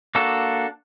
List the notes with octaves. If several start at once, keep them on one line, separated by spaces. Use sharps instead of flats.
A#3 D4 F#4 A4